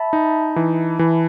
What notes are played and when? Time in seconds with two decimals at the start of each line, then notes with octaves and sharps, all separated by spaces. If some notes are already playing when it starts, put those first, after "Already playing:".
Already playing: E5 A5 B5
0.13 D#4
0.56 E3
0.99 E3